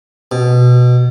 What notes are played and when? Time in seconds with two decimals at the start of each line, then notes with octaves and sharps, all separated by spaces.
0.31 B2